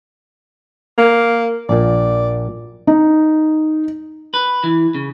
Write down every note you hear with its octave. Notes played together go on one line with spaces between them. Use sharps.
A#3
A#1 A#2 D5
D#4
B4
E3
C#3